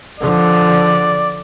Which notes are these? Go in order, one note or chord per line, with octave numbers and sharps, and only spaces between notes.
D3 F3 D5